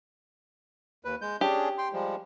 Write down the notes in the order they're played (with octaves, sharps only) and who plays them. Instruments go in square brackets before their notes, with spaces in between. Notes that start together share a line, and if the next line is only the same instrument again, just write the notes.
[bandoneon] D#2 B4
G#3 G6
[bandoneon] C#4 D4 G#4 [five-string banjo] G4
[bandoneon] G5 C6
F3 G3 G#3